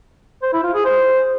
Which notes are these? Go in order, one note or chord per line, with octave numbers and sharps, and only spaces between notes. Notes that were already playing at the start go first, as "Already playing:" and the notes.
C5
E4
F4
G#4
C5